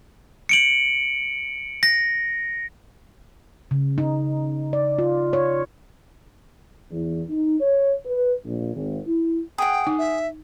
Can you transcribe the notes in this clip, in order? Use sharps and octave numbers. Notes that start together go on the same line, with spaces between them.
C#7 D7 F#7
A#6
C#3
D#4
D5
F4
C#5
E2
D#4
C#5
B4
A#1
G#1
E4
G#4 F#5 G5
D#4
E5